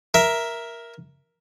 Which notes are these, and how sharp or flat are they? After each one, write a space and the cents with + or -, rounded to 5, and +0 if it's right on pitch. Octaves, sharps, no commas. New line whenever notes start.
A#4 +10 E5 +0